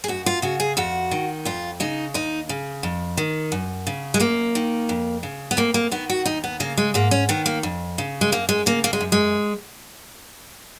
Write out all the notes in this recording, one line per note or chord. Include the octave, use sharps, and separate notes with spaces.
G#4
F#2 F#4
F4
C#3 F#4
G#4
F2 F#4
D#3
F2 F4
C#3 D#4
D#2 D#4
C#3
F2
D#3
F#2
C#3
G#3
F#2 A#3
D#3
F2
C#3
B3
F2 A#3
A#3
D#3 B3
F#4
D#2 D#4
B3
C#3 A#3
G#3
G#2 A#3
C#4
D#3 B3
A#3
F2
C#3
G#3
F#2 A#3
G#3
C#3 A#3
A#3
G#3
F#2
G#3